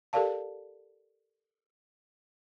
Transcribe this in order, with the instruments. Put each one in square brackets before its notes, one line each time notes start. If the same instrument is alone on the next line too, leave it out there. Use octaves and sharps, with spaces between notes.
[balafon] G4 A4 A#4 D5 F5 A5